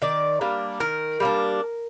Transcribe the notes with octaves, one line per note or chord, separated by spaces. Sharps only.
D#3 D5
G3 A#3 D4
D#3 A#4
G3 A#3 D4